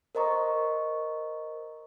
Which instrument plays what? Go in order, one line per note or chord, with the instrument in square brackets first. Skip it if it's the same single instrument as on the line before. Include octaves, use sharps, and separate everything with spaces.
[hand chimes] A#4 C5 D#5 A#5 C#6